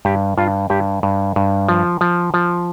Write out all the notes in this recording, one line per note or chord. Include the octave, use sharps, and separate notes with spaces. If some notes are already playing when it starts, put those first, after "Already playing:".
G2 G4
G2 F4
G2 G4
G2
G2
F3
F3
F3